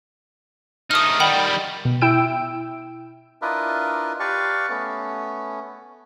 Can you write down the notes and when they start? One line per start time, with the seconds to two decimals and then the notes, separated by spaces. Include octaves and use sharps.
0.91 A3 D#4 D#6 F6
1.20 D#3 G3 F#5 G5 B5
1.85 B2
2.01 E4 G5 E6 D7
3.42 D4 E4 F4 A#4 B4 D#5
4.20 G4 B4 D5 F5 A5 C#6
4.70 A3 B3 C#4